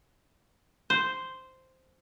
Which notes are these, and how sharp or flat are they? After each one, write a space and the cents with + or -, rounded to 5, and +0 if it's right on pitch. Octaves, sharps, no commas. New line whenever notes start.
C5 -5